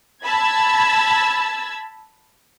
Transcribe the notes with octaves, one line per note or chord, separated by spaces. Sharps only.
A5 B5 E6 G#6 A6